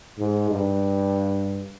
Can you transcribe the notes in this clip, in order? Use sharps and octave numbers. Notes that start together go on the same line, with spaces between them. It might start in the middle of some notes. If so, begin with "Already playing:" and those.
G#2
G2